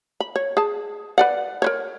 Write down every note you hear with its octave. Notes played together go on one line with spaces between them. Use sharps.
B5
C#5
G#4 A5
B4 D5 F#5
A#4 B4 C#5